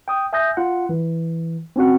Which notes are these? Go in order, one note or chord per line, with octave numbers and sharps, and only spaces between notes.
G5 D#6
E5 G#5 D#6 G6 A#6
F4 F#5
E3
C4 C#4 F#4 F#5